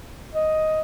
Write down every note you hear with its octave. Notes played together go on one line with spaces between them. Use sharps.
D#5